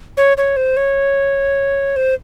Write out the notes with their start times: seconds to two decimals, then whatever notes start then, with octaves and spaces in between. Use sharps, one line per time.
0.17 C#5
0.37 C#5
0.56 C5
0.77 C#5
1.96 C5